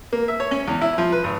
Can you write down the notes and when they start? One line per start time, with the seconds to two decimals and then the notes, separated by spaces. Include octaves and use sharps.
0.13 A#3
0.28 E5
0.40 C#5
0.51 C#4
0.68 E2
0.81 E4
0.98 F3
1.12 B4
1.24 G#1